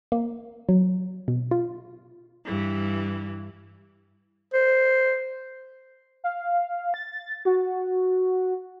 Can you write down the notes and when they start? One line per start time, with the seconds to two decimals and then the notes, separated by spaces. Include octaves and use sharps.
0.12 A#3
0.69 F#3
1.28 B2
1.51 F4
2.44 G2 E3
4.53 C5
6.24 F5
6.94 A6
7.45 F#4